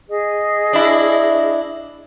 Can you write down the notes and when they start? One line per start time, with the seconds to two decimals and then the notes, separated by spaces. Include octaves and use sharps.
0.09 G#4 D#5
0.73 D4 E4